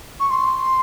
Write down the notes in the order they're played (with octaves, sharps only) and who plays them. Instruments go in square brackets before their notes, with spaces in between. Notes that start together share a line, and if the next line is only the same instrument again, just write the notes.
[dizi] C#6
C6